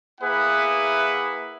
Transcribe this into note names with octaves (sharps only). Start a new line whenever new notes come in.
A#3 E4 G#4 B4 F#5